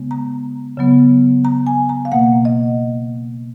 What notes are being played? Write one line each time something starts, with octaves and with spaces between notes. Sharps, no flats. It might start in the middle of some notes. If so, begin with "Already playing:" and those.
Already playing: C#3 G#3 B3
A#5
C#3 F#3 B3
A#5
G#5
A#5
F5
B2 A#3 F#5
D#5